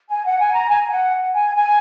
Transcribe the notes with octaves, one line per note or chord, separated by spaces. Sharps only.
G#5
F#5
G#5
A#5
G#5
F#5
G#5
G#5